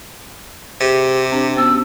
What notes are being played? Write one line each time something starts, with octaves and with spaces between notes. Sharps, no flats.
C3 G4 G#4
C4 D4 G4
B3 C#4 F#4 E6